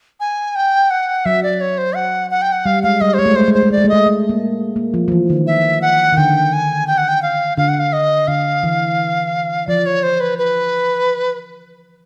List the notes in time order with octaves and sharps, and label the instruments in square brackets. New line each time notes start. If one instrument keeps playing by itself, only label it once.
[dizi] G#5
G5
F#5
[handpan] F#3 [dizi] E5
[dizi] D5
C#5
C5
F#5
F#5
G5
F#5
[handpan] G3 [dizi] F5
[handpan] G#3 [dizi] F5
[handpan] G3 [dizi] D#5
[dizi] C5
[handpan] G#3 [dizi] C#5
[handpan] A3
[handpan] G#3 [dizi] C5
[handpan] A3
G#3
[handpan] A3 [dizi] C5
[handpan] G#3
[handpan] A3 [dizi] D5
[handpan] G#3
A3
[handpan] G#3 [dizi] D#5
[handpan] A3
A#3
A#3
F3
F3
E3
D#3
[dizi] E5
F#5
[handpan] D#3
[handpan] D3 [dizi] G5
[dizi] G#5
G5
F#5
G5
F5
[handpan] D3 [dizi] F5
[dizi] F#5
F5
D#5
[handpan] D3 [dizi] F5
[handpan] E3
[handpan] F3 [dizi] D5
[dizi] C#5
C5
B4
B4